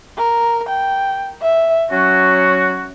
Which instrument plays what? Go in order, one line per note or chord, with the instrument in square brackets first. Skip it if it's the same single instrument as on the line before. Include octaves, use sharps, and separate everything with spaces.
[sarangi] A#4
G5
E5
[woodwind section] F#3 F#4 [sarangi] C#4